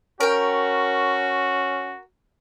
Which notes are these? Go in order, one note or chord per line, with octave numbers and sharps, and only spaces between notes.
C#4 F#4 A#4 G5